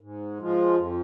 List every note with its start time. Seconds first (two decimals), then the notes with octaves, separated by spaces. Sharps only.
0.01 G#2
0.39 F3 G#3 F4
0.76 F2